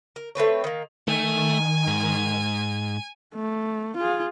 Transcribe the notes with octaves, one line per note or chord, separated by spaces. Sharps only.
A#4
A3 C4 B4 C#5
D#3 A#3
D#3 A3 G#5
G#2
A3
F4 G#4